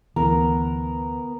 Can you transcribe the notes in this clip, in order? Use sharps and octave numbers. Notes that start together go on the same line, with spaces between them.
D2 E3 B3 A#4